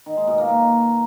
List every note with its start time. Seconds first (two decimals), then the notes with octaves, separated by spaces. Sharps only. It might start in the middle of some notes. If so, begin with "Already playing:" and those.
0.06 D#3
0.17 G#3
0.27 B2
0.38 A#3
0.49 A#3